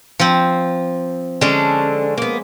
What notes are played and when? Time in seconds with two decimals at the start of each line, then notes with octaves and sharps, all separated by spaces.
0.19 F3 C4
1.41 D3 G#3 C#4 D4 A4
2.18 A#3 B3